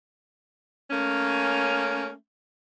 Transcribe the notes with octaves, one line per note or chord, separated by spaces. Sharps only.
A3 A#3 C#4